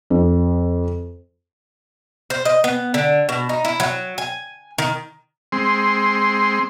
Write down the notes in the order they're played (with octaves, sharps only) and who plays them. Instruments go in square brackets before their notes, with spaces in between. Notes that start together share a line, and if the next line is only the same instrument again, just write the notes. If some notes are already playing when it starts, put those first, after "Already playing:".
[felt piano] F2
[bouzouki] C5
D#5
B3
D3
B2
D#4
E4
F#3
G#5
D#3
[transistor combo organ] G#3 C4 C6